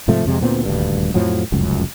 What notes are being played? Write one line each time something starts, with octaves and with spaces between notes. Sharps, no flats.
G#2 C3 F3 A3
F2 C3 G#3
D2 A#2 B3 C4
D#1 D2 G2
F2 A2 F3 F#3
F1 C#2 F#2